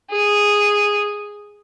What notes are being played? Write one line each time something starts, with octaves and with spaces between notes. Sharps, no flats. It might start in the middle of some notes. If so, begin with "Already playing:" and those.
G#4